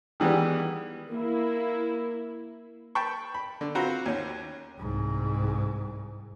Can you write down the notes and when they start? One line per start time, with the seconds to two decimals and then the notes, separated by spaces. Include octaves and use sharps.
0.20 D#3 E3 G3 G#3 B3
1.12 A#3 E4
2.95 G5 A5 B5 C#6
3.34 B5
3.61 D3
3.75 C4 F4 F#4 A#5 B5
4.06 D#2 C#4
4.78 C2 G#2